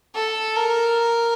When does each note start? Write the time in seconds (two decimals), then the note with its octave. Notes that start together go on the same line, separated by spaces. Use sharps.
0.15 A4
0.56 A#4